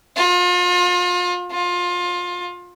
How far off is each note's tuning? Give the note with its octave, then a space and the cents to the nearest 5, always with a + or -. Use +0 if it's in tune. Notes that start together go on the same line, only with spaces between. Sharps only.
F4 +35
F4 +25